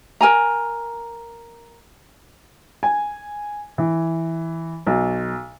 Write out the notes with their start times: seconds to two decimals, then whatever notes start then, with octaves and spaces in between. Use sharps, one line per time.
0.21 A#4 G#5 A#5
2.83 G#5
3.78 E3
4.86 B1